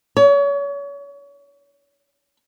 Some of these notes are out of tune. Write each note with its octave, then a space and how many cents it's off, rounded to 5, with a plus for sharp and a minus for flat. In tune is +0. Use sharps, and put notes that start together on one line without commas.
C#5 +35